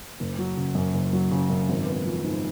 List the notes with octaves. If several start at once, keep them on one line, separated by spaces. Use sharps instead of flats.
F#1
F#3
C#3
F#2
F#1
F#3
C#3
F#2
G#1
B3
F3
G#2